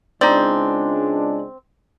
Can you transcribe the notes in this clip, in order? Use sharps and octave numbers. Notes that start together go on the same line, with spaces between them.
C#2 G#3 C4 D4 D#4 D5